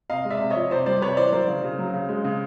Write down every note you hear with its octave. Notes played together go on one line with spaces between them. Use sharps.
C3 D#5 F5
G#3
D5 E5
C3
C#5 D#5
F3
C3 C5 D5
G3 C5 D5
C3 B4 C#5
E3 C5 D5
F#3 A#4 C5
C#3
C#3
F#3
C#3
G#3
C#3